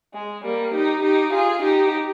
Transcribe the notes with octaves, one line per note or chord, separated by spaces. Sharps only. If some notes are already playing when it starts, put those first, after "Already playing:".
G#3
G3 A#3
D#4 G4
D#4 G4
F4 G#4
D#4 G4